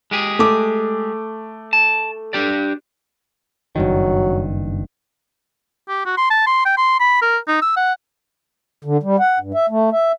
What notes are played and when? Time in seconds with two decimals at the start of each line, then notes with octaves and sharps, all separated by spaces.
0.11 G#3 G4 G#4
0.39 A3 D6
1.73 A5
2.33 D4 G4 D5
3.76 F#1 G2 D#3 F#3
5.88 G4
6.06 F#4
6.17 C6
6.30 A5
6.47 C6
6.65 G5
6.77 C6
7.00 B5
7.22 A#4
7.48 D#4
7.62 E6
7.77 F#5
8.85 D3
9.03 G3
9.19 F#5
9.40 G2
9.54 E5
9.70 A3
9.92 E5